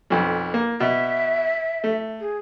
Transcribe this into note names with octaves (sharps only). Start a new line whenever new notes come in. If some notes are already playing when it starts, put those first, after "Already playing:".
B1 F2
A#3
B2 E5
A3
G#4